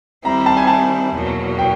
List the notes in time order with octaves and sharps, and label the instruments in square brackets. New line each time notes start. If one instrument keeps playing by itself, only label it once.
[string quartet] D#3 G3 C4 E4 [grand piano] A#5
[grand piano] A5
G#5
A5
[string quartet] E2 B2 F#3 A#3
[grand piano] G5